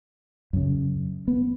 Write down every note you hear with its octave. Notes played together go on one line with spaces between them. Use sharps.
F#2 C#3
B3